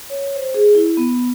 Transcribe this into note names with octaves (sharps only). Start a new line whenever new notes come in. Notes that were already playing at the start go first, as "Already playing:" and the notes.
C#5
C5
G#4
E4
B3